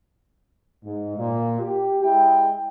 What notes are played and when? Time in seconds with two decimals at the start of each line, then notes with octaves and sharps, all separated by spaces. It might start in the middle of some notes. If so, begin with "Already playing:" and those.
0.84 G#2
1.17 A#2
1.60 G4
2.03 G#3 E4 G5